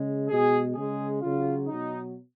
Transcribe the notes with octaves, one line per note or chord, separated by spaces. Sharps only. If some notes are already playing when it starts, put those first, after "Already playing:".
Already playing: C#3 G#3
B2 G#3 G#4
C#3 G#3 G#4
C#3 F#3 F4
B2 F#3 D#4